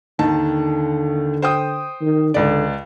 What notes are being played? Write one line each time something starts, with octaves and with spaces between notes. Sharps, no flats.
D#2 D3 D#3 A5
C5 G5 D#6
D#3
C#2 D3 D5